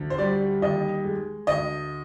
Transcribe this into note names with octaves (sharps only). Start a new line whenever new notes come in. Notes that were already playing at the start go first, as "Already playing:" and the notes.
Already playing: D2
C5
G3 D5
D#2 D#5
G#3
D2 D#5